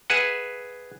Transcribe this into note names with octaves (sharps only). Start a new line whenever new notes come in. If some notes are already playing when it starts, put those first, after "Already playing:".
G#4 B4 E5 F#5